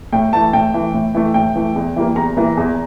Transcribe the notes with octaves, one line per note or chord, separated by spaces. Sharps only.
A2 G5
E3 A3 A5
A2 G5
E3 A3
A2
E3 A3
A2 G5
E3 A3
E2
E3 G3 A#3
E2 A#5
E3 G3 A#3
E2